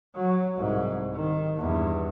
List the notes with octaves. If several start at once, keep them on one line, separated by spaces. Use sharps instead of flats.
F#3
C2 G#2
D#3
E2 G2